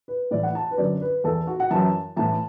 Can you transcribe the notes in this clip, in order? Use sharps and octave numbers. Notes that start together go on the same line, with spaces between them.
B4
A2 E3 D5
F#5
A5
B4
F#2 D3 D5
B4
E2 E3 A4
F#4
F#5
F#2 E3 A5
A2 E3 A5